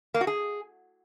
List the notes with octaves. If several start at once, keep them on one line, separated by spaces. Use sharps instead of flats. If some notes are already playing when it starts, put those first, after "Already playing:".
A#3
F#4
G#4